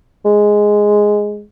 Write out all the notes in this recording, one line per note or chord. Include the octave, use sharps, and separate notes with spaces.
G#3